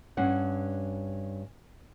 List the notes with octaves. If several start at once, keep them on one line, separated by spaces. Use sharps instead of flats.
G2 C#4 F#5